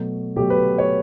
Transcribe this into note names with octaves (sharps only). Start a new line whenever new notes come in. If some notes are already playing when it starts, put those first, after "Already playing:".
Already playing: B2 F#3 A3
B2 F#3 A3 G4
B4
C#5